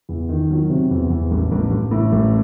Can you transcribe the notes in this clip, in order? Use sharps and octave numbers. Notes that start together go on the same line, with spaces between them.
E2
D#3
F#3
C3
E2
E2
A1
A1
A1
A2
A1